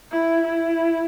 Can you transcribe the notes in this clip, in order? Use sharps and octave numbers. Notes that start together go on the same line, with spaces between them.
E4
E4